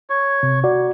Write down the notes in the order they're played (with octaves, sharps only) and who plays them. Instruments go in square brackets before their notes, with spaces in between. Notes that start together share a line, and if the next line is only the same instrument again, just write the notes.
[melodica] C#5
[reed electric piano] C3
F#4 D5